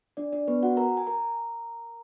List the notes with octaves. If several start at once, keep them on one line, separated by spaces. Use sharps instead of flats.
D4 D5
D4 D5
B3 B4
F#4 F#5
A#4 A#5
G#5
A#4 A#5